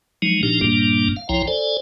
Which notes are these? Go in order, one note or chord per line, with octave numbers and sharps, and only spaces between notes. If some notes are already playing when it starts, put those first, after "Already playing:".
F3 F#3 G#3 D#4
A#2 F3 D4 D#4 G4
G2 A#2 G3 A#3 D4
F5
C2 F3 E4 C#5 G5 A#5
A4 C5 D5 G#5